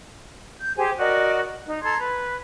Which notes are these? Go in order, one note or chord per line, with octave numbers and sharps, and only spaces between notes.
G6
G4 G#4 C5 G#5
F#4 A#4 D5 D#5
D#4
A4 A#5 C6 G#6
B4